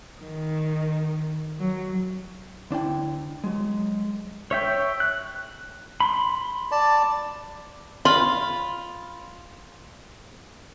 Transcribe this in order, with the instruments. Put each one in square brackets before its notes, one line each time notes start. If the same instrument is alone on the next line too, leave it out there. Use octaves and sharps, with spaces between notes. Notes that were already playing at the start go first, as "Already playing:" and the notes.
[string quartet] D#3
F#3
[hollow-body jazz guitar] D2 D4 E4 G5
F#3 G#3
[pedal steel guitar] C#5 E5 G5
F#6
B5 C6
[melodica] D5 A5
[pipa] F4 [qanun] B5